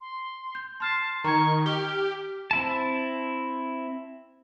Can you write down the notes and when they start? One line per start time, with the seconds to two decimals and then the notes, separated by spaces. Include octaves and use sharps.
0.01 C6
0.55 G6
0.80 A5 C6 F6 C7
1.24 D#3 A#5 C#6 G#6
1.66 G4 F6 G7
2.51 C4 E4 A5